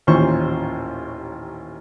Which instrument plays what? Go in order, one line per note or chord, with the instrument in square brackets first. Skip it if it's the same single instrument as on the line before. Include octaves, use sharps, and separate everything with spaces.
[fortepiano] A1 D#2 A#2 C#4 C5 C#6